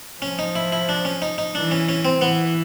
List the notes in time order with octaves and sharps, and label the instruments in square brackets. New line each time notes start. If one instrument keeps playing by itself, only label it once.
[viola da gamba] F3 [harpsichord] C#4
[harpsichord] D#4
E4
E4
D4
C#4
D#4
D#4
[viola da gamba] E3 [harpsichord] D4
[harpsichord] C#4
C#4
C4
[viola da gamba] E3 [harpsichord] B3